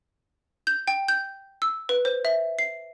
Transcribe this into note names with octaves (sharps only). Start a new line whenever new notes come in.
G6
G5
G6
E6
B4
C5
E5
C7